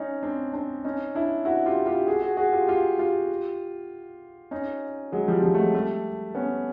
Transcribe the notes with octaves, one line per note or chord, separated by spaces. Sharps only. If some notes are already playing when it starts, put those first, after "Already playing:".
Already playing: C#4 D#4
C4 D4
C4 D4
C#4 D#4
D4 E4
E4 F#4
F4 G4
F4 G4
F#4 G#4
F#4 G#4
F#4 G#4
F4 G4
F4 G4
F4 G4
C#4 D#4
F#3 G#3
F3 G3
F3 G3
A3
F#3 G#3
G3 A3
B3 C#4